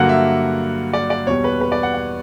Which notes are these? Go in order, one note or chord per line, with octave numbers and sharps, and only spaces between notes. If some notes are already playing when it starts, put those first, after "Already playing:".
Already playing: G2 D3 F#3 A#3 F#5
E5
D5
D5
E2 B2 G3 C#5
B4
B4
D5
F#5
F#5